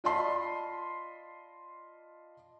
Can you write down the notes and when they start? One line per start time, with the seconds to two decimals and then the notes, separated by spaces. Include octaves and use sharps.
0.04 F4 D5 D#5 A5 B5 C6